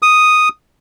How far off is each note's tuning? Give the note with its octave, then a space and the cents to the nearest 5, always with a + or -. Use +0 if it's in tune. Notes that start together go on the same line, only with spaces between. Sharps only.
D#6 +0